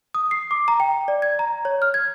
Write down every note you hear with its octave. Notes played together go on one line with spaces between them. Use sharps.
D#6
C7
D6
A#5
G5
D5
G#6
A#5
C#5
F6
G#6